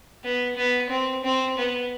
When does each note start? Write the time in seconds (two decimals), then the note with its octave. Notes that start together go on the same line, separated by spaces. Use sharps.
0.24 B3
0.57 B3
0.90 C4
1.24 C4
1.58 B3